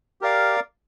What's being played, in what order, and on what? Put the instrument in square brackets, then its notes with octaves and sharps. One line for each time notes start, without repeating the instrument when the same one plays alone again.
[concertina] G4 A#4 D5 F5